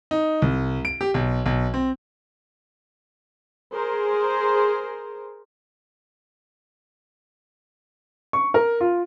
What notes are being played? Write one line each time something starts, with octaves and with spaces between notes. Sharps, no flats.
D#4
C2
D7
G4
B1
B1
C4
G#4 A#4 C5
C#6
A#4
F4